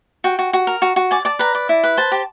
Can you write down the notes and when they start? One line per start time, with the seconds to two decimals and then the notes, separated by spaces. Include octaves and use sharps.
0.24 F#4 G5
0.39 F#4
0.53 F#4
0.67 A#4
0.82 F#4
0.96 F#4
1.11 D5 G#5
1.25 D5 A5
1.39 B4 A#5
1.55 D5
1.69 E4
1.84 B4
1.97 C5 A5
2.12 G4